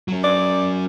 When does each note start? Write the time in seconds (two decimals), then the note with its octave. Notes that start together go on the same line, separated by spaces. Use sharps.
0.08 F#3 C#4
0.24 D5